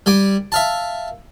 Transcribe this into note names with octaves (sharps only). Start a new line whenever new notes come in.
G3 G#5 D6
E5 F5 A5